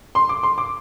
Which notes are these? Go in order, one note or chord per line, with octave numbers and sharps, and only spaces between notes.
C6
D6
C6
D6